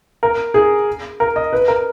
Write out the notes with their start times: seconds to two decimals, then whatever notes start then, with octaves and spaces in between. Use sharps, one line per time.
0.23 A#4
0.54 G#4
1.20 A#4
1.36 D#5
1.53 B4
1.68 A#4